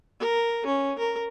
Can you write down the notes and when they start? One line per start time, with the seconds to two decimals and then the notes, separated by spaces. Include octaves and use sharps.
0.20 A#4
0.66 C#4
0.99 A#4